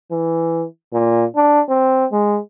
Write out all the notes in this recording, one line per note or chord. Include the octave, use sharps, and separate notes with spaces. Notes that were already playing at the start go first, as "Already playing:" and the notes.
E3
A#2
D4
C4
G#3